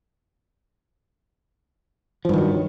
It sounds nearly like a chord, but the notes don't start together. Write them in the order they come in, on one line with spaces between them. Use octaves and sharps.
F3 G2 D#3 F#3